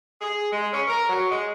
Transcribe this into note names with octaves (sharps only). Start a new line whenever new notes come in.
G#4
G#3
C#4
A#4
F#3
G#3